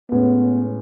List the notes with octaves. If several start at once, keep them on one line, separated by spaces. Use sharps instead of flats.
A2 G#3 B3 C#4